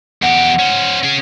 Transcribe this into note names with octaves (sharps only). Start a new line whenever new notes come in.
E2 G4 F#5
C#4 C5
C#4 G#4